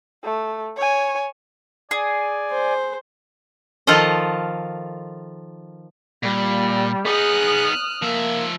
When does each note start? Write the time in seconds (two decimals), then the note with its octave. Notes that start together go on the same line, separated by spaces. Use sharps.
0.24 A3
0.77 C#5 G#5
1.91 G#4 D5 G#5
2.50 C5
3.87 D#3 F3 F4 A4 D#5
6.23 A#2 G3
7.05 B3 D#4 G#4 D#6 F6 F#6
8.02 F3 A#3 E5